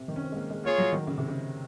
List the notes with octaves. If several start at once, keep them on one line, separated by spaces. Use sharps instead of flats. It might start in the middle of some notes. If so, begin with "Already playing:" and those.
Already playing: C3
D#3
C#4
C4
G#3
A#3
G#3
A#3 F4 G#4 C#5
F#3
D#3
C#3
C3
C#3